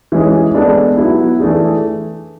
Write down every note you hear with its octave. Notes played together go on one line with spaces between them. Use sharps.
E3 G#3 C#4 G#4
G#3 B3 D4 A4
F#3 B3 E4
E3 A3 D4 G#4